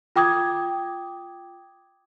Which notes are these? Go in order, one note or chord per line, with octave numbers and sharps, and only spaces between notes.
F4 G5 D6 D#6 G#6